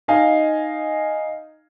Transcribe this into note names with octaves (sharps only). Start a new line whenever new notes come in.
D#4 D#5 F5 G#5